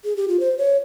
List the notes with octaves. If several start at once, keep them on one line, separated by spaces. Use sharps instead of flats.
G#4
G4
F4
C5
C#5